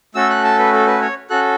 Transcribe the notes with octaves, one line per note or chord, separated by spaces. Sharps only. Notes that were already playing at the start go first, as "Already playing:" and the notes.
A3 C#4 F#4 A4 E6
F#6
A5
B4
A4
B4
C#5
C#4 F#4 A4 F#6